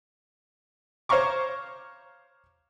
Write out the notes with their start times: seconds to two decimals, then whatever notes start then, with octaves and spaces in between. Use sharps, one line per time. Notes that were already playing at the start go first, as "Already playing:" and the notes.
1.09 C5 C#5 F5 A#5 C#6 D6